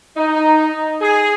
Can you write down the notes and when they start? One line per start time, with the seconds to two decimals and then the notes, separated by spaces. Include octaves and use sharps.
0.17 D#4
1.01 G#4